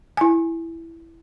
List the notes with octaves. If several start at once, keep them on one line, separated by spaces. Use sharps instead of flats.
E4 G#5